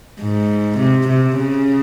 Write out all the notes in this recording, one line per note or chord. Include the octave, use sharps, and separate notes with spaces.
G#2
C3
C3
C#3